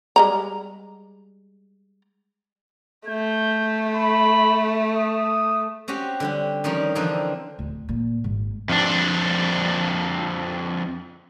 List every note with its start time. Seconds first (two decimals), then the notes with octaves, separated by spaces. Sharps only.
0.16 G3 G#3 A#5
3.08 A3 G6
3.95 B5
4.96 D#6
5.88 C4 C#4 F#4 G4
6.20 D3 G3 G4
6.64 D#3 F3 G3 C#4 D#4 F4
6.95 D3 E3 F3 C4 D4 D#4
7.59 D1
7.89 A#2
8.24 G#1
8.69 F2 D4